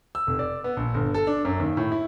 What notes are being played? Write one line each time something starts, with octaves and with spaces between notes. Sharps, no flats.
E6
F1
D5
B3
A#1
G1
A4
D4
F#2
D#2
A2
E4